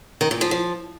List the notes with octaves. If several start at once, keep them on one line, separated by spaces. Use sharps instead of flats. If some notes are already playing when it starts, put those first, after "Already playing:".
D#3
A#2
F3
F3